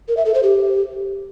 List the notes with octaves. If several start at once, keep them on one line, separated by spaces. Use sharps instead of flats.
A#4
E5
A4
C5
G4